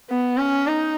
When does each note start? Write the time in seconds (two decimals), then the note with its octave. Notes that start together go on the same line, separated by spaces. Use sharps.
0.10 B3
0.38 C#4
0.67 D#4